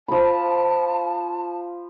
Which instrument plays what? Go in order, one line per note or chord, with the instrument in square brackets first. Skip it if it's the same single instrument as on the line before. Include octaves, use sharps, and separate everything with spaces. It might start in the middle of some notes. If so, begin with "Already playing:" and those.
[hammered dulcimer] F3 B5 [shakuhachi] A5